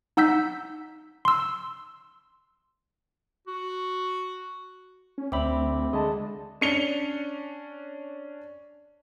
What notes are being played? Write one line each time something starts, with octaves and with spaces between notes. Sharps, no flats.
D#4 F#5 E6 G6 B6
C6 E6
F#4
C#4
D2 C4 D5 E5 B5 D6
D3 G#3 D#5 A5
C#4 D4 C#7 F7 G7